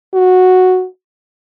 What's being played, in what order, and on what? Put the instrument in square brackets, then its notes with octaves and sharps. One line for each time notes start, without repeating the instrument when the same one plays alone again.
[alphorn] F#4